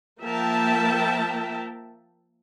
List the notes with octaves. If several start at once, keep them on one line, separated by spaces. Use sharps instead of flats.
F3 A#3 A#4 E5 G5 A5